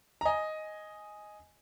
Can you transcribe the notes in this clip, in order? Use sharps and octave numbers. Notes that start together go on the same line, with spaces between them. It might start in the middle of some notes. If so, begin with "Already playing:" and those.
A#5
D#5 G#5